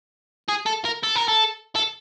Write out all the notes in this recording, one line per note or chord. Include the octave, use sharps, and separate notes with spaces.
G#4
A4
A#4
A4
A#4
A4
A4